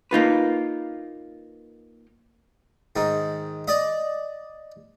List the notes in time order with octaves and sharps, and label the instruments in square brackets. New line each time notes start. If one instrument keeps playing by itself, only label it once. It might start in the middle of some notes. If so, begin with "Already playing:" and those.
[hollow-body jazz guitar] A#3 D#4 F4 B4
[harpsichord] G#2 D#3
D5 D#5